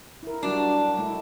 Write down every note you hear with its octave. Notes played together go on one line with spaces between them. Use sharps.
E4 A#4
F#3 G3 D4 F#4
G#3 A3 E4